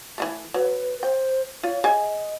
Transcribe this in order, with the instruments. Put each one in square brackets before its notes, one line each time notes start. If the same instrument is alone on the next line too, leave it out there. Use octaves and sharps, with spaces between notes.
[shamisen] E3 G#3 A3
[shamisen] F#3 [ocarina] B4
[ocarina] C5 [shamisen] G5
[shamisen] F4 [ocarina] C#5
[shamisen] G#4 G#5 [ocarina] D#5